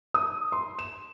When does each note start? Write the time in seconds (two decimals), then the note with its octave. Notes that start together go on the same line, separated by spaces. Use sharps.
0.14 D#6
0.52 C6
0.79 E7